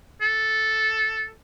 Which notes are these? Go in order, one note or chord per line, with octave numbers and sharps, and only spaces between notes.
A4